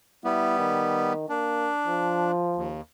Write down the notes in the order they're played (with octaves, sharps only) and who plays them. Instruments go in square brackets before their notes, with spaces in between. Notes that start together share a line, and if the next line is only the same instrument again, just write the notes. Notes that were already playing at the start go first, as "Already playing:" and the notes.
[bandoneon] G3 B3 [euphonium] E4
[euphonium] D#3
[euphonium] A#3 [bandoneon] D4
[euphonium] F3
[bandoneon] D#2